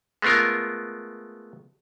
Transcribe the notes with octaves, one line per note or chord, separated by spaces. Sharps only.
G#3 A3 B3 F4 A#4